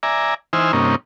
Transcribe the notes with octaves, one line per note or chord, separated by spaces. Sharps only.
D5 E5 G#5 A#5
E3 D#4 C5 G#5 E6 F6
G2 C3 A#3 C#4 D#4